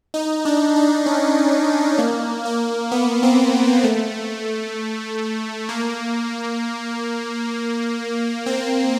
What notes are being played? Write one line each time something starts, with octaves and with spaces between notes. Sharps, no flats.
D#4
D4
D4
C#4
A#3
A#3
B3
C4
A3
A#3
C4